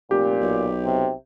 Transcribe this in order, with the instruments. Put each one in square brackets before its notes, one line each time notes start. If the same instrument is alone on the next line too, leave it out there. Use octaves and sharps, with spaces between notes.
[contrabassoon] F1 [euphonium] A#2 [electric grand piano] G4
[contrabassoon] B1
[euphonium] C3